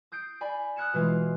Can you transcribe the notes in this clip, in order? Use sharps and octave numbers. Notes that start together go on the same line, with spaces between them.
D#6 G6 C7 D7
D5 G#5 B5
D#6 F6 F#6 G#6 C#7 E7
B2 E3 G#3 F4